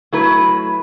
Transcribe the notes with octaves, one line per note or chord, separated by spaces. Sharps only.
F#3 A3 E4 B4